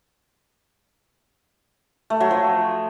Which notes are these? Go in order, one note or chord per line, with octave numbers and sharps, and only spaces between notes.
A3
F#3
F3